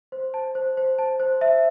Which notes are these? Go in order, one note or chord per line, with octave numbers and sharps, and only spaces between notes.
C5
A5
C5
C5
A5
C5
E5